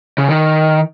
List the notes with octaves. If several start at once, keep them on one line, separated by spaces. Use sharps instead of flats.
C#3
D#3